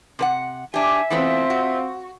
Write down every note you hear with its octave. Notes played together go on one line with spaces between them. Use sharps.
C3 A#4 F#5
D4 G4 E5 G#5
E3 A3 B3 C4 F4
F#4